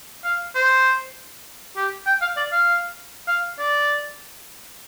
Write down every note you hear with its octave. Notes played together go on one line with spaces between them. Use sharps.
F5
C5
G4
G5
F5
D5
F5
F5
D5